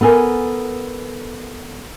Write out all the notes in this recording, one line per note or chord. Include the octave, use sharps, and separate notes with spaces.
B3 A4 A#4 G#5